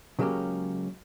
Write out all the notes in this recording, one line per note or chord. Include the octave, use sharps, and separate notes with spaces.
C#3 F#3 G#3 A#3 C#4 G4